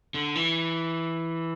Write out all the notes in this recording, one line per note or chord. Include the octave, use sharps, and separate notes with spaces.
D3
E3